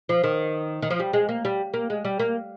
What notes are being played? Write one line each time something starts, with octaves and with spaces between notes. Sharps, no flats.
F3
D#3
D#3
F3
G3
G#3
A#3
G3
A#3
G#3
G3
A#3